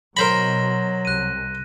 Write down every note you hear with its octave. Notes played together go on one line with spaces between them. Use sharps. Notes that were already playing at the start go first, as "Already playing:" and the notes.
B2 F#3 A#4 C5 B5 A#6
C2 F#6 D#7